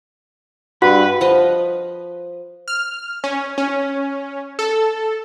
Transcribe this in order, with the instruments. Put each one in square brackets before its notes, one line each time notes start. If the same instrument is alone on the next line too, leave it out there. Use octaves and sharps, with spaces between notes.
[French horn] G2 [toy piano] F#4 [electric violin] B4 [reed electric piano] F#5 B5
[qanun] F3 B4 D#5
[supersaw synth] F6
C#4
C#4
A4